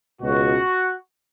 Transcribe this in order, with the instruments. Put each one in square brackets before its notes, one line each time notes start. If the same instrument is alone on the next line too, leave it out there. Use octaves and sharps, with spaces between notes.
[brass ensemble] C#2 B2 F#4